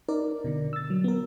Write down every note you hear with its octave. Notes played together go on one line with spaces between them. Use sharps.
D#4 A#4 D5
B2 D3
E6 A6
F#3
B3 A#4